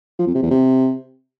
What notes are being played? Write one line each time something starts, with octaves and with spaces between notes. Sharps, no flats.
F3
F2
C3
E2
C3